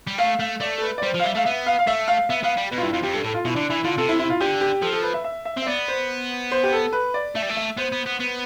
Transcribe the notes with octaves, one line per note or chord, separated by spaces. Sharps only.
G3
A3 F5
A3 F5
A3 D5
A4
B4
D5
G3 C5
F3
F5
G3 E5
A3 F5
B3 E5
F5
F5
A3 E5
F5
B3 E5
B3 F5
G3
B2 B4
F4
G2 E4
F2 F4
F2 G4
G2 A4
A2 A4
F4
B2 E4
D3 D4
E3 E4
D3 F4
C3 A4
E4
E4
F4
D3 G4
G4
F3 A4
A4
B4
E5
E5
E5
C4
E5
B3 D5
C5
C5
G4
A4
B4
D5
A3 E5
G3
A3
E5
B3 C5
B3
B3
B3